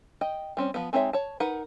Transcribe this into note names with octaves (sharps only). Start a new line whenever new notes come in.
D#5 G5
G3 C4 C#4
F3 B3
G#3 C4 D#4 C#5 E5
C#5 A5
D#4 A#4 B4 F#5